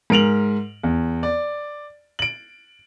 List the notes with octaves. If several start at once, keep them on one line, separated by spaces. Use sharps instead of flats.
G#2 A#4 D7 F7 F#7
E2
D5
D7 F#7